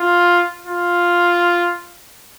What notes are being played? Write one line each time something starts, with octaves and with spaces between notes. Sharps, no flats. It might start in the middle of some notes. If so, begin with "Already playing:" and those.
Already playing: F4
F4